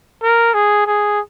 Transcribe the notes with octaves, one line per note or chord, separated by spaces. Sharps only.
A#4
G#4
G#4